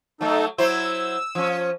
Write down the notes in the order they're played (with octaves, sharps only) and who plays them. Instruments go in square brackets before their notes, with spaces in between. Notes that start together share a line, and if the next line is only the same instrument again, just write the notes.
[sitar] F#3 A3 [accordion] D#4 A4
[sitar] F#3 E4 C5 [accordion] E6
[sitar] F3 C#4